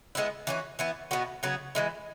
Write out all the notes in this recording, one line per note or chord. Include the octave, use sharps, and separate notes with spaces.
G#3 B3 E4
E3 C#4 F#4
E3 B3 E4
B2 B3 F#4
C#3 F#3 B3 G#4
E3 G#3 E4